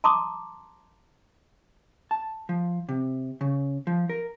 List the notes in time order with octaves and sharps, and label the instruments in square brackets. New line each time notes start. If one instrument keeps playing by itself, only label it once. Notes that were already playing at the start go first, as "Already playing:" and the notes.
[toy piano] A5 A#5 C6 D6 D#6
[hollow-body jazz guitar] A5
F3
C3
C#3
F3
A#4